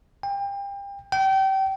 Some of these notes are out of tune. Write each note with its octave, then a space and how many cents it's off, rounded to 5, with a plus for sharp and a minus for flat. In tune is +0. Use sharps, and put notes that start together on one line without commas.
G5 +30
G5 -30